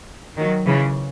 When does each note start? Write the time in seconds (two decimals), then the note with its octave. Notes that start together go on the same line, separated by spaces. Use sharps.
0.38 D#3 F#3
0.67 C#3 E3